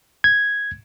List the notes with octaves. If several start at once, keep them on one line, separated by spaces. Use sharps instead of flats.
G#6